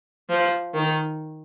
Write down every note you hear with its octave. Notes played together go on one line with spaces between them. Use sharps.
F3
D#3